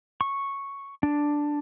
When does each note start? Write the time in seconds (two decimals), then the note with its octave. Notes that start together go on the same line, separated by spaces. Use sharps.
0.21 C#6
1.03 D4